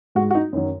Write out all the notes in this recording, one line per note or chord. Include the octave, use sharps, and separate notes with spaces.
G#2 G#3 F#4
F#4
D#4
F#2 D#3 F#3